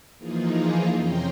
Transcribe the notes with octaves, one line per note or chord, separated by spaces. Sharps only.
E3 F3 A#3 D#4 F4 G#4
F2 C3 C#4 G5 A#5 C6